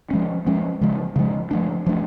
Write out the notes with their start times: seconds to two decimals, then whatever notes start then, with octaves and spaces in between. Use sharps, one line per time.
0.11 F3 G#3 C#4
0.46 F3 G#3 C#4
0.81 C#3 F3 G#3
1.16 C#3 F3 G#3
1.51 F3 A3 D4
1.86 F3 A3 D4